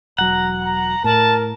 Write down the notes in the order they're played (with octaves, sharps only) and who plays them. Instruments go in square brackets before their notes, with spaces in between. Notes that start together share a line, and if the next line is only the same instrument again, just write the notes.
[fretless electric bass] E1 F#3 [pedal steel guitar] F#5 [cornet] A#5
[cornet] A#5
[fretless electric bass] A2 [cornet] A#4 [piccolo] A5